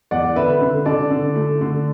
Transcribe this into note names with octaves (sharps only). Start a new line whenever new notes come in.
E2 D5 F#5
D3 B4 E5
B4
D3
D3 A4 D5
D3
A3
D3